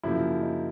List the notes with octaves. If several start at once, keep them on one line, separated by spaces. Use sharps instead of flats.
F#2 C#3 F3 A#3 E4
D#4